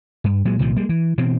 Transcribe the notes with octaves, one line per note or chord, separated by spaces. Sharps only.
G2
A#2 F#3 G#3
C2 A#2 D#3 F3
G3 G#3 A#3
E3
B2 E3 C4